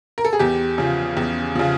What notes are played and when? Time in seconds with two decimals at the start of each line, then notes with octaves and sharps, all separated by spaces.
0.18 A#4
0.25 A4
0.33 G#4
0.39 E2 G4
0.78 C#3 F3
1.17 E2
1.55 C#3 F3